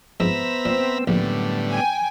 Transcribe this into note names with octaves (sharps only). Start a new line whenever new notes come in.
F2 G#2 B3 C5 E5 A#5 B5 E6
A#2 C4
A#1 F#2 A2 D3 G3 B3
G5 G#5